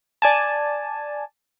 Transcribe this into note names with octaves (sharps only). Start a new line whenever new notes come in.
D5 G#5 A5